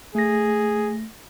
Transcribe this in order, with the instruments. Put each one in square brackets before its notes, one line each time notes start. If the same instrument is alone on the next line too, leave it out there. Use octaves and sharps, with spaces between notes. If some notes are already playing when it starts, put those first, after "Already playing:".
[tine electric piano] A3 A#6 [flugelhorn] G#4